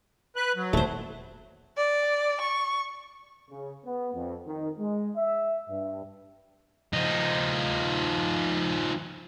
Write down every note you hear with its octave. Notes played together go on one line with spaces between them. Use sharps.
B4 F#6
F#3
D#1 A3 C5
D5
C#6
C#3
B3
F2
D#3
G#3
E5
G2
F3 D#4